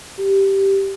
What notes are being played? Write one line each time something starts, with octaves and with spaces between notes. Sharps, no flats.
G4